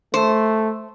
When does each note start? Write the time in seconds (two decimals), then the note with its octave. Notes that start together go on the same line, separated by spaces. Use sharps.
0.14 A3 C5